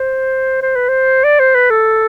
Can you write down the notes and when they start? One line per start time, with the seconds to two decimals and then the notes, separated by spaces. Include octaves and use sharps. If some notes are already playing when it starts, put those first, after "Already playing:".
Already playing: C5
0.62 C5
0.76 B4
0.89 C5
1.24 D5
1.39 C5
1.55 B4
1.70 A4